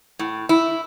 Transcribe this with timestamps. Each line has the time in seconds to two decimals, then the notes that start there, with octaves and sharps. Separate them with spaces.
0.19 A2
0.49 E4